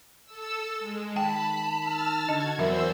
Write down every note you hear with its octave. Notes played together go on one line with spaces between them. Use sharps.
A4 E6
G#3
D#3 G5 A5 B5
E6 F6
D3 F#4 D#5 G#6
E2 F#3 A#4 C5 E5 E6